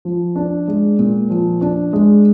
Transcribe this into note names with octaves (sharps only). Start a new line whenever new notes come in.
F3
D4
G#3
A#2
F3
D4
G#3